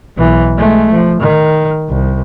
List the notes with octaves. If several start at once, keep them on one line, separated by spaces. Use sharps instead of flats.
B1 E3
G#3 A3
F3
D#3
C2